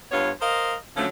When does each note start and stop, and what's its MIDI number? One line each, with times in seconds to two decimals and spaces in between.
0.12 0.31 43
0.12 0.31 59
0.12 0.31 65
0.12 0.31 73
0.41 0.75 70
0.41 0.75 72
0.41 0.75 75
0.41 0.75 77
0.97 1.07 50
0.97 1.07 53
0.97 1.07 54
0.97 1.07 57
0.97 1.07 61